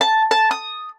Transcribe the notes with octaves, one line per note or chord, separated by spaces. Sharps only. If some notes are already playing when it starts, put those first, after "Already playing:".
A5
A5
D#6